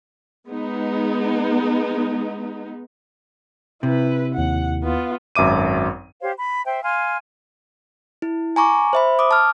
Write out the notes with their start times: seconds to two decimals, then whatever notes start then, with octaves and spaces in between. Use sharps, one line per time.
0.46 G#3 B3 D#4
3.83 C3 E4 B4
4.35 D#2 E4 F#5
4.84 B3 F4
5.35 G#1 F#2 E5 D6 D#7
6.21 G4 C5 C#5 F5
6.37 B5
6.66 C5 E5 G5
6.83 F5 G#5 C6 F6
8.22 E4
8.56 G#5 A#5 C#6 D6
8.93 C5 E5 B5
9.19 D6 D#6
9.31 A5 F6